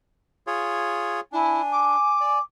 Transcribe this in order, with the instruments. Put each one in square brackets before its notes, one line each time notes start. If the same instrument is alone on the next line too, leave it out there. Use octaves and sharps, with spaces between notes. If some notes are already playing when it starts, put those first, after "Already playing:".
[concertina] F4 G#4 C#5
[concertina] D4 [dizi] E4 [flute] G#5
[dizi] D6
[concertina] D5